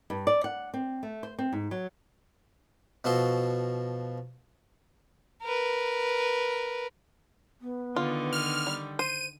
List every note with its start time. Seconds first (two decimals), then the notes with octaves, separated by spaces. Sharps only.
0.10 G2
0.27 D5
0.44 F#5
0.74 C4
1.03 A3
1.23 C5
1.39 C4
1.53 G#2
1.71 F#3
3.04 B2 F3 F#4 A4 C6
5.44 A#4 B4
7.61 B3
7.96 D3 D#3 F4
8.33 F6
8.67 G3
8.99 C5 D#7